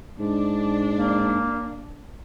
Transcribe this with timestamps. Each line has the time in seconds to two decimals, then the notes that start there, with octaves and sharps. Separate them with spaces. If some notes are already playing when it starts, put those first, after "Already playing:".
0.19 G#2 D4
0.92 A#3